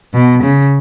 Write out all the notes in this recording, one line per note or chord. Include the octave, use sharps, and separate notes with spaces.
B2
C#3